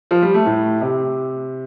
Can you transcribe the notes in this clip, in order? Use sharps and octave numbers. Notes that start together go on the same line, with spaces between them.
F3
G3
A3
A2
C3